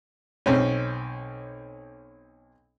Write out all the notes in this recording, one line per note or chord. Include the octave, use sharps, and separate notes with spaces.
B1 C4 C#4